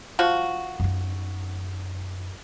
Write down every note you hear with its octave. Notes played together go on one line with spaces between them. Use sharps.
F3 F#4
F#2 D#4